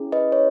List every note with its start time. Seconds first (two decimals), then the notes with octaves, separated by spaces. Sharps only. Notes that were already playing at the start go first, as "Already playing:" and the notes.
Already playing: C#4 E4 G#4
0.12 B4 D#5
0.32 C#5